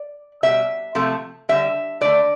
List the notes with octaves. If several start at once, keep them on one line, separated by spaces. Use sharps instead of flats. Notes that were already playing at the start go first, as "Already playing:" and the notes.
Already playing: D5
B2 G3 E5
C3 F3 A3
D3 G3 E5
D3 A3 D5